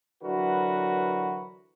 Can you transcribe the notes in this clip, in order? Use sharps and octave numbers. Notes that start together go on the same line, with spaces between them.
D3 E3 F#3 F#4 A#4 B4